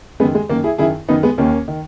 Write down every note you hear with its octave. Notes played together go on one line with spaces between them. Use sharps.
F#2 D#3 G#3 B3
G#3
F#2 D#3 A#3
E4 G#4
F#2 D#3 E4 G#4
F#2 D#3 B3 D#4
G#3 B3
D#2 D#3 A#3 C#4
D#3